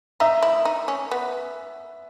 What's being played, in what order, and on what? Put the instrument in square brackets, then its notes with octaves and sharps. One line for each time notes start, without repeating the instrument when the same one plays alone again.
[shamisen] D#4 [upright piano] E5
[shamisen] E4
D#4
C#4
B3